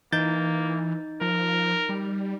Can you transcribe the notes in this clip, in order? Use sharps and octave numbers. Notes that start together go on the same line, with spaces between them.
E3 A#3 D#4 G6 A6
F3 A#4
G3